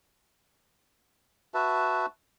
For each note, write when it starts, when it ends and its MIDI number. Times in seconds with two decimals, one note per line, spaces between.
1.54 2.06 66
1.54 2.06 71
1.54 2.06 76
1.54 2.06 81